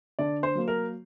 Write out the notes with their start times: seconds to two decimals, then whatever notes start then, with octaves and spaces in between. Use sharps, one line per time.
0.19 D3 D5
0.43 C5
0.55 F#3 A#3
0.68 A#4